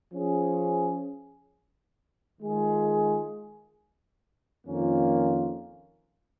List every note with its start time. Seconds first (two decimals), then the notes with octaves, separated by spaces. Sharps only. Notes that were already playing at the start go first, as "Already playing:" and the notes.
0.12 F3 C#4 G#4
2.39 D#3 G#3 F4 G#4
4.66 F2 D#3 A#3 C#4 F4